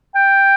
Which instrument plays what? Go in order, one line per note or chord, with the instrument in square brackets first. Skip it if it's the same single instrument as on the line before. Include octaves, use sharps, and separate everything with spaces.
[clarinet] G5